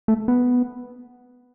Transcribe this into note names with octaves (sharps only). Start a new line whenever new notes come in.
A3
B3